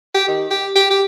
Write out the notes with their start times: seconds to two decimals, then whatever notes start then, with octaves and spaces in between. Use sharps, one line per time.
0.14 G4
0.28 D#3
0.51 G4
0.75 G4
0.90 G4